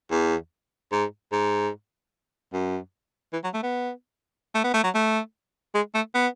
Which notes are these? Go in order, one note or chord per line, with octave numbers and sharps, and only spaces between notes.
E2
G#2
G#2
F#2
E3
F#3
A3
B3
A3
B3
A3
F#3
A3
G#3
A3
B3